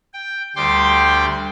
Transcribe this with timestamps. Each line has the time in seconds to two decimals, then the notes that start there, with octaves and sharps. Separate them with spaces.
0.14 G5
0.56 D2 G3 G5 C6 D6